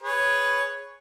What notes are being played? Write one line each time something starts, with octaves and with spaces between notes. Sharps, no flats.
G#4 B4 C#5